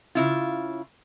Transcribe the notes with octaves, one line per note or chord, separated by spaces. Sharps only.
C#3 E4 F4